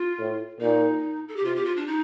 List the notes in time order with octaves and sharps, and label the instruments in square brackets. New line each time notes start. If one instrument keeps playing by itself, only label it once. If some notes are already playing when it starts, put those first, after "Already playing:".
Already playing: [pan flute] F4
[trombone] A2
[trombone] A#2 [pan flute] D#4
[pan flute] A4
G4
[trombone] C3 [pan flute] F4
[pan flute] G4
F4
D4
D#4